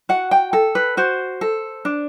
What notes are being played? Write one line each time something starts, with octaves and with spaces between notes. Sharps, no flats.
F#4 F#5
G5
A4
B4
F#4 C5
A4
D4